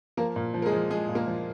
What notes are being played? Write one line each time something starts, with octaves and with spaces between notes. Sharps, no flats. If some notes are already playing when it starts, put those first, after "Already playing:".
F3 A#3 A#4
A#2
F3
A#4
G#3 G#4
F3
F3 G#3 G#4
A#2
A#3 A#4
F3